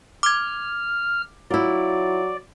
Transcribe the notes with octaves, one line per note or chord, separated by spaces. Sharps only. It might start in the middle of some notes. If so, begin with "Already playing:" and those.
D6 F6 G#6
F#3 E4 F4 D5